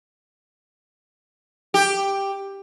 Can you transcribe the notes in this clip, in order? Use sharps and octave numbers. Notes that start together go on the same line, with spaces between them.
G4